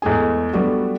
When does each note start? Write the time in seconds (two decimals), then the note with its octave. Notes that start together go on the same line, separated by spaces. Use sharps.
0.02 E2 G#3 A3 G#4 G#5
0.53 F#3 G3 A3 B3 D4 F#4